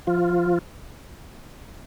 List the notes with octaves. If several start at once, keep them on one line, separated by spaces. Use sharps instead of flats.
F3 F4